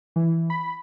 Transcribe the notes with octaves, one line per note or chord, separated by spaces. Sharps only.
E3
B5